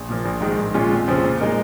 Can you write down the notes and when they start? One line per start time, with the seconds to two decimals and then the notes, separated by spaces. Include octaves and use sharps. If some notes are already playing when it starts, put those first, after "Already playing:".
Already playing: A#1
0.09 A#2 F3 A#3
0.25 A#1
0.41 G#2 D#3 G#3
0.58 A#1
0.74 A#2 G#3 C#4 F4
0.91 F2
1.08 C#3 F3 C4
1.24 A#2
1.40 G#3 D#4 A#4